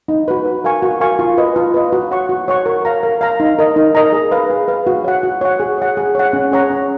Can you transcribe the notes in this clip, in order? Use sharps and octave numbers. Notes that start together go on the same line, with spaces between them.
D#4
F#4 B4
F#4
A#4 F5 G#5 C#6
F#4
A#4 F5 G#5 C#6
F4
B4 D#5
F4
B4 D#5
F#4
C#5 F#5 C#6
F#4
C#5 F#5 C#6
A#4
F5 A#5
A#4
F5 A#5
D#4
A#4 D#5 A#5
D#4
A#4 D#5 A#5
G#4
B4 F5
G#4
B4 F5
F#4
C#5 F#5
F#4
C#5 F#5
G#4
C#5 F#5
G#4
C#5 F#5
C#4
G#4 C#5 F#5 A#5
C#4